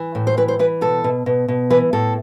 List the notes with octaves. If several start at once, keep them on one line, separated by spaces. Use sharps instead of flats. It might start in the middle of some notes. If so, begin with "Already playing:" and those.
Already playing: E3
A2
C5
E3 B4
C5
E3 B4
B2 A4
B2
B2
B2
E3 B4
A2 A4